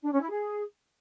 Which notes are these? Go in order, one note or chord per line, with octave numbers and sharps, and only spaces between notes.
D4
C#4
E4
G#4